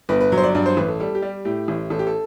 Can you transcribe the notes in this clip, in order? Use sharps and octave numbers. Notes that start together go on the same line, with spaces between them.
G1 B4
B4
F#3
C5
D5
G2 D5
C5
A1 B4
A4
G3 A4
G4
G3
A2 G4
A1
A1 A4
G4
A4